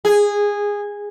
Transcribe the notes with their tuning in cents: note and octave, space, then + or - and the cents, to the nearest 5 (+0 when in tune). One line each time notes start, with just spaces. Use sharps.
G#4 -15